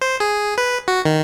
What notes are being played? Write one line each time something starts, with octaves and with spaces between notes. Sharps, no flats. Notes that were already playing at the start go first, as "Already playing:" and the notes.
C5
G#4
B4
F#4
D#3